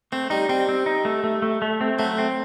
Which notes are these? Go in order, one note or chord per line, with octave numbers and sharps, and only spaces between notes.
A3 C4
G3 D#4
G3 C4
C4
D#4
A3
A3
A3
A3
C4
F#3 A3
C4